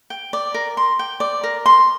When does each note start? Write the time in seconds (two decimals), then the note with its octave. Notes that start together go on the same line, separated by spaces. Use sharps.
0.10 G5
0.33 D5
0.54 A#4
0.77 C6
0.99 G5
1.20 D5
1.44 A#4
1.66 C6